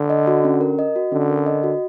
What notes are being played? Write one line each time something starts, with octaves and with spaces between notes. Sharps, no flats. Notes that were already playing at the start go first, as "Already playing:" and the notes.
Already playing: D3
D#5
F#4
C#4
A#4
D#5
F#4
D3 C#4
A#4
D#5
F#4